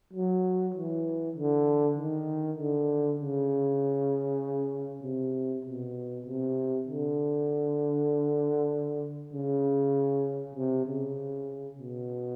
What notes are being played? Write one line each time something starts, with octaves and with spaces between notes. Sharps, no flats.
F#3
E3
D3
D#3
D3
C#3
C3
B2
C3
D3
C#3
C3
C#3
B2